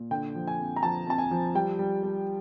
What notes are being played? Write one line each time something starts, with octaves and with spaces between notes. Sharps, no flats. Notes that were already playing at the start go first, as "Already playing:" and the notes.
Already playing: A#2
D3 G5
F3
G#5
F2
A#5
F3 A5
F2 A5
G#5
F3
G3 G5
G3
G3